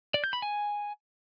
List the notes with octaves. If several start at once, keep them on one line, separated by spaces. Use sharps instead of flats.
D5
G6
B5
G#5